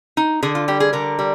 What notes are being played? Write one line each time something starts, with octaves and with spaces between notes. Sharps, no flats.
D#4
D3 G#4
F4
G3 G4
G#4
D3 A#4
G3